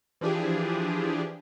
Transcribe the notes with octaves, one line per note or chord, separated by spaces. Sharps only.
E3 F3 D4 G4 G#4